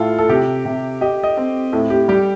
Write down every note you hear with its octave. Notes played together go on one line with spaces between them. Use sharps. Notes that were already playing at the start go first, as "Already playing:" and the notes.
Already playing: A2 F4 A4
A4
C3 G4
C3
G4 D#5
D#5
C4
A2 A4
G4
G3 G4